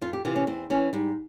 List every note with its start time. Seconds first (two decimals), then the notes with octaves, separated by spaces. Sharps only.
0.01 F2 F4
0.13 G4
0.25 C3 E3 F4
0.36 C#4
0.47 E2 C4
0.70 E3 C#4
0.93 G#2 G3